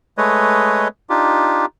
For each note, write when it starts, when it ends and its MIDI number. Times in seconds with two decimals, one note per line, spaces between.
0.18 0.88 56
0.18 0.88 57
0.18 0.88 71
0.18 0.88 73
0.18 0.88 75
1.10 1.66 62
1.10 1.66 63
1.10 1.66 65
1.10 1.66 67